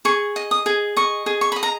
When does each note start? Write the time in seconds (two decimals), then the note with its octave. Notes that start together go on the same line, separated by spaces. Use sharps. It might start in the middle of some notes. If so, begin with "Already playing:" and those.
0.05 G#4 C#6
0.36 D#5
0.51 D#6
0.66 G#4
0.97 D#5 C#6
1.26 G#4
1.41 C#6
1.52 D#5 B5
1.63 A#5